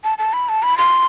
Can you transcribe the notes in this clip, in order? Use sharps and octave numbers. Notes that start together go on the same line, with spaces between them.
A5
A5
B5
A5
B5
C6